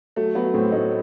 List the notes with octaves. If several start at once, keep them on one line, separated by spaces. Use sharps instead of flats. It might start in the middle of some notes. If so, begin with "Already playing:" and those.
F#3 A3
F#3 B3
A2 C4
A2 D#4